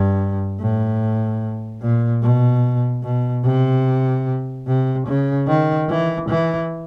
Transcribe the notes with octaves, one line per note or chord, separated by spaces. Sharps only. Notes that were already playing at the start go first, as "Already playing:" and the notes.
Already playing: G2
A2
A#2
B2
B2
C3
C3
C#3
D#3
E3
E3